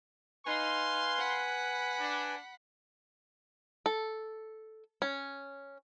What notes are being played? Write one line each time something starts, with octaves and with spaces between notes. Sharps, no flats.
D#4 B4 F5 G#5 C6
F#5 B5
D4
A4
C#4